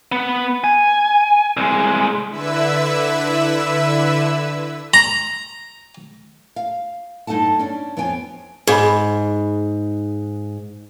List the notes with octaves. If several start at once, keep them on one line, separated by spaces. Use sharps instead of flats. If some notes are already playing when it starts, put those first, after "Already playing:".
B3
G#5
C2 G#3
D3 E4 B4 E5 E6
A#5
F5
G2 D#4 A4 F#5 A5
C#4 D4
F2 B3 C#5 G5 G#5
G#2 G#4 B5